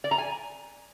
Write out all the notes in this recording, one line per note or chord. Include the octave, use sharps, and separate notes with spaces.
D5
A#5
G#5